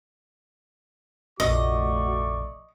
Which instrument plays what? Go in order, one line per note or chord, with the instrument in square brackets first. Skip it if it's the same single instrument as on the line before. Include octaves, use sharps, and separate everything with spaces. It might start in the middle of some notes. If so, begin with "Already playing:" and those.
[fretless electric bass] F1 A#1 [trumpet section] A3 D5 C#6 [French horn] F#4 [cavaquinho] D#5